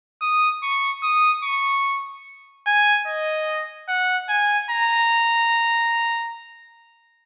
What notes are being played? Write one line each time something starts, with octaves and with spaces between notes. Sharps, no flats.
D#6
C#6
D#6
C#6
G#5
D#5
F#5
G#5
A#5